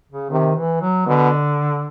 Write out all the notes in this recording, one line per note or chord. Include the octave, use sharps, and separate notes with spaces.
C#3
C3 D#3
E3
F#3
B2 D3